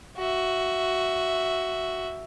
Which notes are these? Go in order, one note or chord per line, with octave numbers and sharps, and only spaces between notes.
F#4 E5